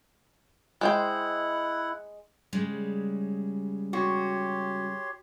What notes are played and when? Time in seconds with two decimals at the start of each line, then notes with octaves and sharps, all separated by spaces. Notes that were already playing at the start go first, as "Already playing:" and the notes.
0.81 G#3 E4 C5 F#5 G5
2.53 C#3 G3 G#3
3.93 F#4 G4 C#5 C6